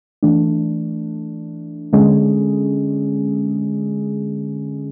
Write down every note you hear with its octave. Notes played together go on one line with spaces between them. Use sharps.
E3 A3 D4
D3 G#3 C#4 G#4